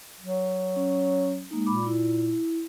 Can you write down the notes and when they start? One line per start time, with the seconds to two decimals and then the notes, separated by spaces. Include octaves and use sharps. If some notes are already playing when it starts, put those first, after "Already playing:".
0.21 F#3
0.76 C#4
1.51 G#3 A#3 D#4
1.66 A#2 B5 D6
1.86 E4